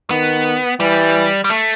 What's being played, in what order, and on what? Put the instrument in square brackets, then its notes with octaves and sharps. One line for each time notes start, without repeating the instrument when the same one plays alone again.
[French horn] D#3 [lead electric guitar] B3
[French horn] E3 [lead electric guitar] G3
[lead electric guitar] G3
A3